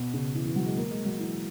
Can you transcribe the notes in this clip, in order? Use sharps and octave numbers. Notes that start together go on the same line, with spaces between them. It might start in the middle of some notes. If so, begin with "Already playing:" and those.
Already playing: B2
C#3
E3
E3
F#3
G#3
A#3
G#3
F#3
E3